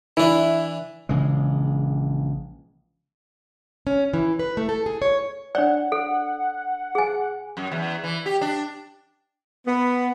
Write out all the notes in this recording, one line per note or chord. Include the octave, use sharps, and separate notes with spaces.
E3 D4 E4
A#1 C#3 E3 G#3
C#4
E3
B4
A3
A4
G#4
C#5
D4 C#5 D5 F#5
A4
G#4 G#5
F#2
E2
E3
G4
D4
B3